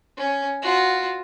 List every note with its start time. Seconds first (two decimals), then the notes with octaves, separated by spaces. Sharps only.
0.17 C#4
0.62 F4 F#4